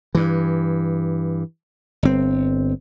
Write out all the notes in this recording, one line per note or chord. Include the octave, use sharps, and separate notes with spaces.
G2 E3
G1 C4